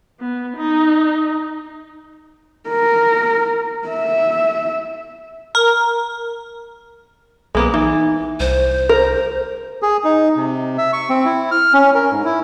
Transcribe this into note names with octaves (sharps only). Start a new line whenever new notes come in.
B3
D#4
A#4
E5
A#4
B1 G#3 A#3 B3
E3 D#4
C2 C5
A#4
G#4
D#4
C3
E5
C#6
C4
E4
F6
C#4
A#4
G#2
E4